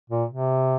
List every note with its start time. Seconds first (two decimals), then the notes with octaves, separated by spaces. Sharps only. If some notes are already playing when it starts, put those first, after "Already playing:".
0.10 A#2
0.30 C3